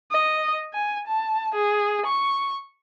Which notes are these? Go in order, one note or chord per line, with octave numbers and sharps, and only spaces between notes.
D#5
G#5
A5
G#4
C#6